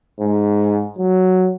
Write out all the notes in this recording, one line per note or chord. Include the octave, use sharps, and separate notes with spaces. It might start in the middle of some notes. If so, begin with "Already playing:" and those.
G#2
F#3